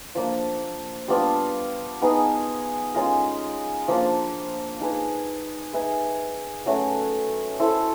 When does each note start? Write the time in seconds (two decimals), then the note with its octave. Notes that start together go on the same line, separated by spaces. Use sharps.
0.15 F3 A#3 D4
1.08 G3 B3 D4 F4
2.02 B3 D#4 G#4 B4
2.94 G#3 C#4 F4 A#4
3.88 F3 A#3 D4
4.80 D#4 G#4 B4
5.73 D#4 G#4 B4 E5
6.66 F#3 A3 C#4 F#4
7.59 E4 A4 C5